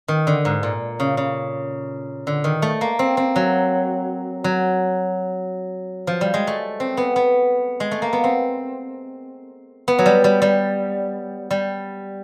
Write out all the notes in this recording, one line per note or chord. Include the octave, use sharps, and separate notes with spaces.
D#3
D3
G#2
A#2
C#3
C#3
D3
D#3
A3
A#3
C4
C4
F#3
F#3
F3
G3
G#3
A3
C4
B3
B3
G#3
A3
A#3
B3
C4
B3
F#3
G3
G3
G3
G3